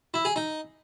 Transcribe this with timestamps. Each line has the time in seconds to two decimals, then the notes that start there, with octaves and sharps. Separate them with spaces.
0.14 E4
0.25 G#4
0.36 D#4